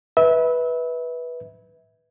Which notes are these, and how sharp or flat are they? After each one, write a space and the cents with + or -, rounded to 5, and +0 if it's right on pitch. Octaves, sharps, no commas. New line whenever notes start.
B4 -10 E5 -30